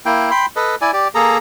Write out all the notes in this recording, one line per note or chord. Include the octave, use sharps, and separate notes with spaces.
A#3 E4 G5
G5 B5 C6
A4 B4 D#5
E4 D5 G#5
G4 D5
A#3 G#4 A4 A#5